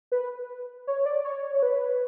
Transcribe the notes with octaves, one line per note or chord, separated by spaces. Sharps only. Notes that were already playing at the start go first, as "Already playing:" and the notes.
B4
C#5
D5
C#5
C#5
B4